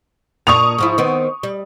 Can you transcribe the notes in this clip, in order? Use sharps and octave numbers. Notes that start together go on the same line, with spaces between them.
A#2 D4 C#6 D#6 F7
G#2 F3 E4
D#3 B3 C4
G3